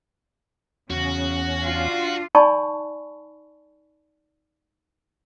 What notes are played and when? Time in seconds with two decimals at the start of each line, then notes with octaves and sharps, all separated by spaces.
0.90 E2 C#3 C#4 F#4
1.65 D4 F4
2.35 D#4 D5 G#5 A5 B5 C#6